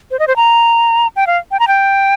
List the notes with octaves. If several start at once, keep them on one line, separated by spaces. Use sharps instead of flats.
C5
D#5
C5
A#5
G5
F5
G5
A#5
G5